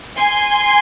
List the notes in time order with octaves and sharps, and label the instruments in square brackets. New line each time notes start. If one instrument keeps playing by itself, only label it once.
[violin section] G#5 C6